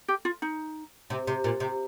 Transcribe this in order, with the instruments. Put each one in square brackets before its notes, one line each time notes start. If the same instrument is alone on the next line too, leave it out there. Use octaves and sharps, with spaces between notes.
[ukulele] G4
F4
D#4
[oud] C3
C3
A#2
C3